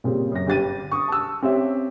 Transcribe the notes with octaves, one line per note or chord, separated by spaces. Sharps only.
A#2 C#3 G3 C4
F#2 A#6
G1 G4 A6 D#7
C#6 D#6
A5 E6
C4 C#4 G4 E5